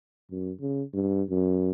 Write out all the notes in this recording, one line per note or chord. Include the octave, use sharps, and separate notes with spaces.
F#2
C#3
G2
F#2